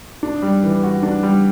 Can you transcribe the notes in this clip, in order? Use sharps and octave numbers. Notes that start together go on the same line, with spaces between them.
D4
G3
E3
F#4
D4
G3